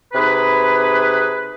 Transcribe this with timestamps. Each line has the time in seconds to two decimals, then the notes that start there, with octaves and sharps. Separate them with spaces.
0.14 C3 D#4 G#4 B4